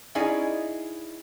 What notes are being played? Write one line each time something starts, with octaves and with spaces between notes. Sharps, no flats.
C#4 D#4 E4 G#4 D5 D#5